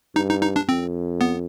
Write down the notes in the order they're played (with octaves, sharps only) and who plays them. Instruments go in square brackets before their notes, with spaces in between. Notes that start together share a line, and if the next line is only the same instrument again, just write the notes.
[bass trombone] G2 [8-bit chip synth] D#4
[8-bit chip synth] D#4
D#4
D4
[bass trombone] F2 [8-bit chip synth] C4
[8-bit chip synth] B3